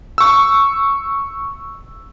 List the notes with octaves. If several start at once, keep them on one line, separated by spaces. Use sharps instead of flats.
C#6 E6